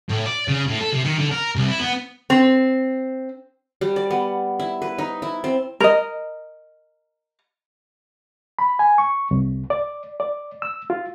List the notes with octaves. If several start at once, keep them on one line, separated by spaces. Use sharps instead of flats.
A2
D5
C#3
A2
A4
C3
D#3
D3
A#4
C2
E4
B3
C4
G3
D5
B3
E4
B4
D#4
E4
C4
A#4 D#5
B5
G#5
C#6
C2
D5
D5
E6
F4